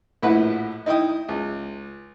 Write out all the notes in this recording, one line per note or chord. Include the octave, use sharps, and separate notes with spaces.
A#1 A2 E4 B4 F#5
D#4 E4 G5 D#6
C#2